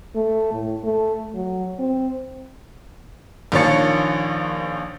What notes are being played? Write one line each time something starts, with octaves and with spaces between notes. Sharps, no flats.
A3
A2
A3
F#3
C4
A#1 D#3 F3 C#5 A6 C#7